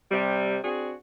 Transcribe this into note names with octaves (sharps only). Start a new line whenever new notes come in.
C3 G3
C4 D4 F#4 G#4